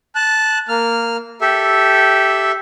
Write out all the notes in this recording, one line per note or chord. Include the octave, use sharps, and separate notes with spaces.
A5 F#6
A#3 F6
G4 A4 E5